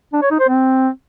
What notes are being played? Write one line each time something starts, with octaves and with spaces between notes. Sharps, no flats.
D4
C#5
D#4
C5
C4